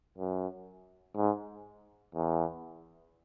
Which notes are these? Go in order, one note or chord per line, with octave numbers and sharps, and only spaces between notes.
F#2
G#2
E2